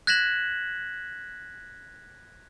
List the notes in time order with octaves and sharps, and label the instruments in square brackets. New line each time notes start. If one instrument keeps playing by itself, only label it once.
[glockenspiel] F#6 G#6 A#6 B6 E7 F#7